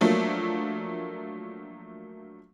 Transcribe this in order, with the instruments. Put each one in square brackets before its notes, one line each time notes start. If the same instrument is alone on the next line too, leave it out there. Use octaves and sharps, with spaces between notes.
[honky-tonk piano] F3 F#3 A3 A#3 D4